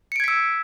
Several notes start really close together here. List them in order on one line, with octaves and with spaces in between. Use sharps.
C#7 D7 G#6 B6 E6